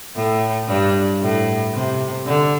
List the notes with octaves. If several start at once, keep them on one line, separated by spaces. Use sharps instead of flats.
A2
G2
A2
C3
D3